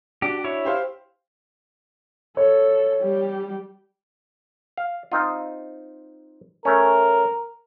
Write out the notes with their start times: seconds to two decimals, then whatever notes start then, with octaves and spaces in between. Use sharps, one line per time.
0.22 D4 F#4 G4
0.44 E4 C#5
0.65 G4 C5 F5
2.37 A4 C#5
3.02 G3 G4
4.77 F5
5.12 C4 D#4 F4
6.65 A3 C#4 A#4